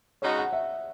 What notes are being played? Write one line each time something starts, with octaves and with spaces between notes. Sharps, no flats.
C#3 G#3 D#4 F#4 C#5
F#5
E5